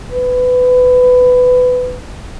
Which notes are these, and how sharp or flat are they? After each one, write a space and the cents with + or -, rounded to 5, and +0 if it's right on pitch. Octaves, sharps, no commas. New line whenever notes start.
B4 +20